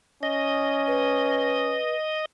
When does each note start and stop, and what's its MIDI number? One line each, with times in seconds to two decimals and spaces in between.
0.23 1.80 61
0.23 2.25 75
0.87 1.95 71